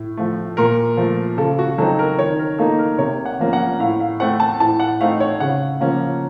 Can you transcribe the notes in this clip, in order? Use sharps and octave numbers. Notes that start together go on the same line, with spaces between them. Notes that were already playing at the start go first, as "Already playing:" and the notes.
Already playing: A2
F3 A3
A#2 A#4
F3 A3
C#3 A4
F#4
F#3 C4 D#4 A4
A#4
D#3 C#5
A#4
A#3 D#4 A4
A#4
C3 C#5
F#5
F3 A#3 C#4
F#5
A2 F5
F5
A3 C4 F#5
A5
A2 A5
F#5
A3 C4 D#4 F5
C#5
C#3 F#5
F3 A#3 C#4